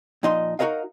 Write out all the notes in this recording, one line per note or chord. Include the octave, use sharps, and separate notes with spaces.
A#2 F3 D#4 D#5 C6
D#4 F#4 G#4 A#4 D#5 F5